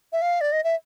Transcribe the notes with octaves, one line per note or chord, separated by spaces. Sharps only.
E5
F5
D5
D#5
E5